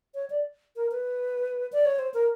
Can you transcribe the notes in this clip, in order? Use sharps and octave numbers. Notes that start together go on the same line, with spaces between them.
C#5
D5
A#4
B4
D5
C#5
C5
A#4